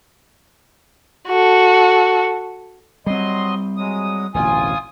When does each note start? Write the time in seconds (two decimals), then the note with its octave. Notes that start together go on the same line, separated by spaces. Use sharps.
1.28 F#4 A4
3.06 F#3 G3 C4 D#5 C6
3.77 F#3 G#3 D#6
4.34 D1 A1 B2 F4 G#5 D#6